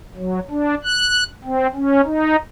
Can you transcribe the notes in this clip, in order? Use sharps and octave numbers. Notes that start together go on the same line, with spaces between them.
F#3
D4
F#6
C4
C#4
D#4